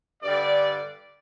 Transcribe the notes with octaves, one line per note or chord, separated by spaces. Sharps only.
G2 D3 G3 D5